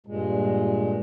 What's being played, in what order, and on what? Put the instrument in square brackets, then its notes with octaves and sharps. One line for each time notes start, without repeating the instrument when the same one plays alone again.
[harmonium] G2 A#2 G#3